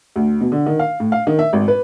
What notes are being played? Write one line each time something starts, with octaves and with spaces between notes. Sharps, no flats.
D2
B2
D3
D#3
F5
A2
F5
D#3
E5
G#1
B4